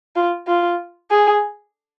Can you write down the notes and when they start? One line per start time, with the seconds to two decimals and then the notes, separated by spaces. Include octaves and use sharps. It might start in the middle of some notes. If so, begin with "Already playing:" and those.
0.16 F4
0.47 F4
1.11 G#4